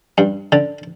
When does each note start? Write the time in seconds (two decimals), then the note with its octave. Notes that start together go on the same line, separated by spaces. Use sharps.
0.18 G2
0.52 D3